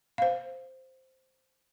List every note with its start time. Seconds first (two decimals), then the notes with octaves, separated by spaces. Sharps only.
0.18 C5 F5